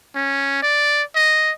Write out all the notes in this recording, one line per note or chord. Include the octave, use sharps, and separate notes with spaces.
C#4
D5
D#5